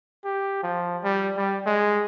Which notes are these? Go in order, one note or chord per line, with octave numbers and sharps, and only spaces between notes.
G4
F3
G3
G3
G#3